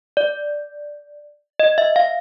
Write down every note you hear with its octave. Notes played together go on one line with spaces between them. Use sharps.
D5
D#5
E5
F5